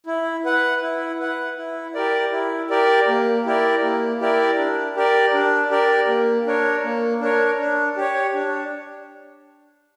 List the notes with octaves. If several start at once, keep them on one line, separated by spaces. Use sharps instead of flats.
E4
B4 F#5
E4
B4 F#5
E4
G4 A#4 D5
E4
G4 A#4 D5
A#3
E4 G4 A#4 D5
A#3
E4 G4 A#4 D5
D4
G4 A#4 D5
D4
G4 A#4 D5
A#3
D4 A#4 C#5
A#3
D4 A#4 C#5
D4
G4 C#5
D4